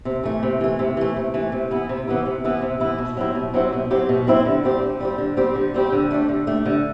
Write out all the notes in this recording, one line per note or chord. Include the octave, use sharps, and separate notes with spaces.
C3
E3 A3
C3
E3 A3
C3
E3 A3
C3
E3 A3
C3
E3 B3 E4
C3
E3 B3 E4
C3
E3 B3 E4
C3
E3 B3 E4
B2
F#3 C4 E4 G4
B2
F#3 C4 E4 G4
B2
F#3 C4 E4 G4
B2
F#3 C4 E4 G4
D3
G3 C4 G4
D3
G3 C4 G4
D3
G3 C4 G4
D3
G3 C4 G4
D3
A3 D4 G4
D3
A3 D4 G4
D3